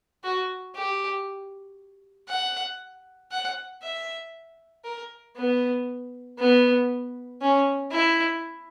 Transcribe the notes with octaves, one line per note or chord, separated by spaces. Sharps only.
F#4
G4
F#5
F#5
E5
A#4
B3
B3
C#4
E4